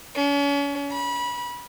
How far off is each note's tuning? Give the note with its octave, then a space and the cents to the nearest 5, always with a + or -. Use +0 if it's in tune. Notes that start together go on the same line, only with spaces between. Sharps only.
C#4 +40
B5 -25